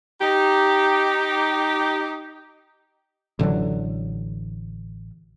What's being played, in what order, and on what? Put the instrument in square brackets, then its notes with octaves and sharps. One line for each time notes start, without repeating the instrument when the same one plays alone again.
[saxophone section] D#4 G4
[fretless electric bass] A1 D3 D#3 F#3